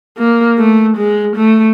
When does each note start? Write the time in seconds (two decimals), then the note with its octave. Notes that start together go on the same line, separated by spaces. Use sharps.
0.18 A#3
0.58 A3
0.97 G#3
1.36 A3